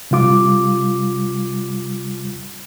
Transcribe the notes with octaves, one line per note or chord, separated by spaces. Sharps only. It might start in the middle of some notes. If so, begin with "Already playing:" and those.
C3 G3 F4 D6